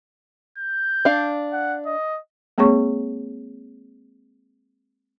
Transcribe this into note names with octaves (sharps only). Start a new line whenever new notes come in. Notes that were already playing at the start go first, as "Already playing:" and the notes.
G6
D4 F5
F#5
D#5
G#3 A#3 C4 G#4 C#5 C#6